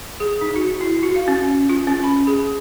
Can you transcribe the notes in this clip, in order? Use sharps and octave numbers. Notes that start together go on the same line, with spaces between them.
G#4
D#4
F#4
E4
F#4
F5
C#4
F4
C#4
B5
G#4